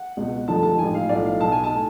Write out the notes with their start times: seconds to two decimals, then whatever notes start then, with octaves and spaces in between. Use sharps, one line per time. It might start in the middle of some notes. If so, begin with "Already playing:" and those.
Already playing: F#5
0.17 C#2 B2
0.48 F1 F2 D3 F3 A5
0.63 A5
0.78 A1 G#2 F3 G#5
0.94 F5
1.09 B1 A2 F3 D5
1.25 F5
1.40 B1 B2 A5
1.52 G#5
1.64 A5
1.73 A2